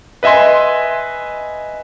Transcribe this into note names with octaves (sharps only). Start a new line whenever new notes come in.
B4 D#5 E5 G#5 C6